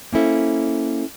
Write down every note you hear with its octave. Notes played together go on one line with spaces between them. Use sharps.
A#3 C#4 E4 A4 C5